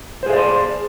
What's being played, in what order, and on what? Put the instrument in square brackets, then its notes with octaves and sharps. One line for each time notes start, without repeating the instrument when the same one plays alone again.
[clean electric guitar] C5
G#4
E5
D5
C6